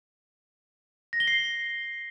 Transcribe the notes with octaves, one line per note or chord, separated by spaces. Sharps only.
A#6
G7
C7